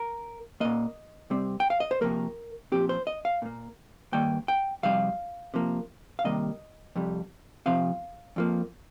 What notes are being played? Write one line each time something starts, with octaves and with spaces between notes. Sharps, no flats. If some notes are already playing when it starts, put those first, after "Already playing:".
Already playing: A#4
A#2 A#3 D#5
C3 G3 C4
G5
F5
D#5
C5
C3 F3 A#3 A#4
A#2 F3 C4 G4
C5
D#5
F5
A#2 A#3
G2 D#3 A#3 G5
G5
F2 C3 G3 F5
C3 F3 A#3
F5
C3 D#3 G3 A#3 D#5
F2 C3 G3
C3 F3 C4 F5
F2 F3 A#3